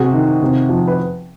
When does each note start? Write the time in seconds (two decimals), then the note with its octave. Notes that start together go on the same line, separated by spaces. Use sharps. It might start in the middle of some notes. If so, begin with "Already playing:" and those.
Already playing: C3 F#4 G#4
0.13 D#3
0.42 C3
0.69 F3
0.88 B4